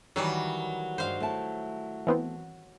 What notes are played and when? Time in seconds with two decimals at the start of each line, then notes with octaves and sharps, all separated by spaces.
0.16 D#3 E3 F#3 G3
0.98 G2 G#3 C5 F5
1.20 A3 E4 A5
2.07 E3 B3 C4